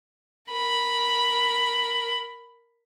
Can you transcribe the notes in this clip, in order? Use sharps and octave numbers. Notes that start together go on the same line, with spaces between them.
A#4 B5